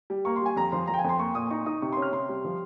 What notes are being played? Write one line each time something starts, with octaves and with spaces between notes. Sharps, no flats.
G3
A#3 C#6
C6
G3 G#5
F2 A#5
F3 C6
F3 A#5
G5
G#5
F2
C6
A#3 C#6
A#2 D#6
D#4 C#6
D#4 D#6
C3 C#6
C#4 C6
F6
C3 C6
G3
F3